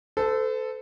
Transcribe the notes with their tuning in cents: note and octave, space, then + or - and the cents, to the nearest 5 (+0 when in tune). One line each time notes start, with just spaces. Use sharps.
A4 +0 C5 -40